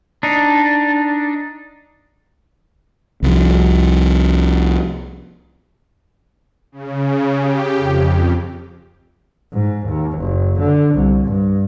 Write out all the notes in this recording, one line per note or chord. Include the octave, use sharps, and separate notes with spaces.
D4 D#4
C2 F3
C#3
G4
F2
G#2
D#2
F#1
D3
C2
G2